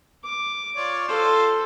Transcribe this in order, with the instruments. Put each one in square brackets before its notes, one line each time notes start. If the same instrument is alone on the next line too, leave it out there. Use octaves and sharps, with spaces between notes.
[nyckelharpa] D6
[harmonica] F4 C#5 D5
[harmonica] F4 C5 [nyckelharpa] A4